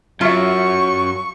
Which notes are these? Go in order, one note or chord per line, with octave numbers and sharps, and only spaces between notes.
F#2 F#3 F4 E5 C#6